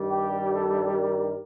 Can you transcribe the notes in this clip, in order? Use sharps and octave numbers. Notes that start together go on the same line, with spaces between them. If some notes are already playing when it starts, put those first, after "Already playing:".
Already playing: G2 D#3 G3
G4
A4
A#4